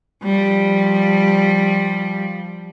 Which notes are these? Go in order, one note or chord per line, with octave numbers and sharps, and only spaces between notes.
F3 G3